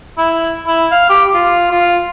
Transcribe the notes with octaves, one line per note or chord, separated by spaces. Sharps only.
E4
E4
F5
G4
F4
F4